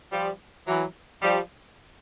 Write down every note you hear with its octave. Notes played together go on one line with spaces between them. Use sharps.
F3 G3
E3 F#3
F3 G3